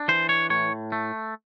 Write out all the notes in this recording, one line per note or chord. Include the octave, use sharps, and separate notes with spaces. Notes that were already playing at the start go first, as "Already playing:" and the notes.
Already playing: D4
E3 C5
C#5
A2 C#5
A3